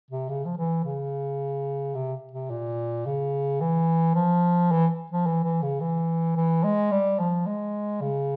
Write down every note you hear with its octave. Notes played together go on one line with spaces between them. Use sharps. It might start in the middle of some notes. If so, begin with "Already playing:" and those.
C3
C#3
F3
E3
C#3
C3
C3
A#2
C#3
E3
F3
E3
F3
E3
E3
C#3
E3
E3
G#3
G3
F3
G#3
C#3